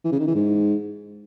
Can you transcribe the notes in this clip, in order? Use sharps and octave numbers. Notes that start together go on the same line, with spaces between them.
E3
C#3
D#3
E3
G#2